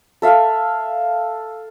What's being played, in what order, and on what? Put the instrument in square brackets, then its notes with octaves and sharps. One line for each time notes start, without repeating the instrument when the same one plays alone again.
[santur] A4 E5 F5